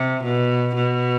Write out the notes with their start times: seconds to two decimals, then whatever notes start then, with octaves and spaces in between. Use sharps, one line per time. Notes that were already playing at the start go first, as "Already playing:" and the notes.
Already playing: C3
0.24 B2
0.75 B2